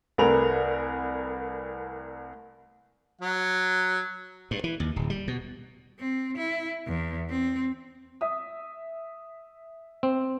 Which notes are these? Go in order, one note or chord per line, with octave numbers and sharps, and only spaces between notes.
C2 A3 A#4 B4 G#5 F7
F#3 F#5
G2
E3
D#2
D1
G3
B2
C4
E4
E2
C4
E5 D#6
C4